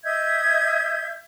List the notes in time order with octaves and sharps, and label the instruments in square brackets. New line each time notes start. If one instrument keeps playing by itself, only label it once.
[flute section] D#5 E5 G6 G#6